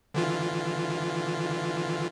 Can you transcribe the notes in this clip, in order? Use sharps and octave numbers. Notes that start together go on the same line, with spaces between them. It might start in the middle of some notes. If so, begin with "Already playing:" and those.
D3 E3 F4